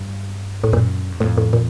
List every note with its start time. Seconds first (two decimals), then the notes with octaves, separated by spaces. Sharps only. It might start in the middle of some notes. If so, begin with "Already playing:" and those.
Already playing: G2
0.64 A2
0.72 F#2 A#2
1.12 E2
1.20 F2 A2
1.37 A2
1.53 A#2